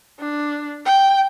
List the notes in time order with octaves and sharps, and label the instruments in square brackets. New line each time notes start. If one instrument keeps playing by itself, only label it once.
[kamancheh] D4
G5